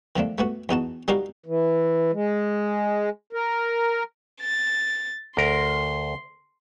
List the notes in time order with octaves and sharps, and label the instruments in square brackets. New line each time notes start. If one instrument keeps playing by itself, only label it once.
[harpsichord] D#3 F3 A3 D4
A3 B3 F#4
E2 D#4 F#4 A5
G3 D#4 F#4 G4 A#4 F5
[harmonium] E3
G#3
A#4
[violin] A6
[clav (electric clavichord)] D2 A#4 [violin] C6